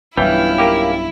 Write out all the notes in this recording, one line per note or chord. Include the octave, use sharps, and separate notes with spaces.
B1 G2 E3 C#4 E4 F4 G5
A#3 G4